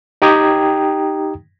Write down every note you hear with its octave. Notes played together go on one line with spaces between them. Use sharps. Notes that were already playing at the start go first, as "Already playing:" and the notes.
D#4 G4 G5 A#5 D#6 G#6